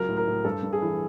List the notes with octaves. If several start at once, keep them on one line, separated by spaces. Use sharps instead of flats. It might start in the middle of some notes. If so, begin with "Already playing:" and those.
Already playing: C#2 F#3 A#4
A2
A#4
A2
G2 A4
G2
G#4
E3